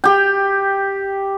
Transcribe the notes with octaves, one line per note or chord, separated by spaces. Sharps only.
G4 G5